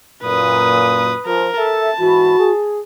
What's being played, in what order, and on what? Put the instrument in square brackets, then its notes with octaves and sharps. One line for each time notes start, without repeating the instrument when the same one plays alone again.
[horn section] F#2 A#2 [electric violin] B4 D#6
[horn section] F3 [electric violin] A#4
[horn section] A4 E5 [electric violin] A5
[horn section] G#2 E3 B5 [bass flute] F#4
[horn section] G#4